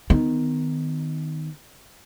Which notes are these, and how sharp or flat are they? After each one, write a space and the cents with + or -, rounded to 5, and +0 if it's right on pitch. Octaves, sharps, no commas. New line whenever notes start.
D#3 +0 B3 +30